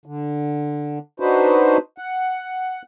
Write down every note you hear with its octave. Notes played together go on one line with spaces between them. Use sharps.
D3
D4 D#4 F#4 B4 C5
F#5